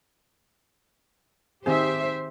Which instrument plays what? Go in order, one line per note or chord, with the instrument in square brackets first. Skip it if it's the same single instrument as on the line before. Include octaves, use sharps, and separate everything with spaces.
[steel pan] D#3 C4 G#4 [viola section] G4 E5 [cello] C5